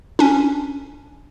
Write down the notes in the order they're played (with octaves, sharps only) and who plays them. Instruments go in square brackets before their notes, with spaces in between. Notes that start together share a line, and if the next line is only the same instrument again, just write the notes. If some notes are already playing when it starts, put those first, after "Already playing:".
[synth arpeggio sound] C#4 D4